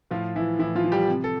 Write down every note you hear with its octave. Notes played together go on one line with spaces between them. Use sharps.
A2 F3 F4
E3 E4
A2 E3 E4
F3 F4
E3
G3 G4
C3
A4